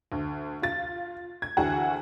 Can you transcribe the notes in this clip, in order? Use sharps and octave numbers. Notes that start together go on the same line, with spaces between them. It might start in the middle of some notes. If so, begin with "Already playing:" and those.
D2
F4 A6
G#6
D2 E3 E4 F#4 G#4 F#5